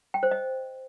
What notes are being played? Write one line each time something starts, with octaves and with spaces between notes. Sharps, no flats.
G5
C5
D#5